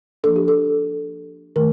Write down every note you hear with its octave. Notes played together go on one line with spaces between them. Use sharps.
F3 A#3 D4 A4
G4
A4
D#3 A3 A#4